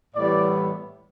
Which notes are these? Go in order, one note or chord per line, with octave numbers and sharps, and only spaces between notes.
A2 E3 G3 B3 D5